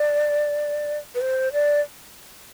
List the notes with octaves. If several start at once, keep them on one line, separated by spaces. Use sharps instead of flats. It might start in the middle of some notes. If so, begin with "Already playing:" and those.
Already playing: D5
B4
C5
D5